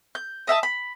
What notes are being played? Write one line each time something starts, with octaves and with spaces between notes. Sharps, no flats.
G6
D#5 E5 F#5 A5
B5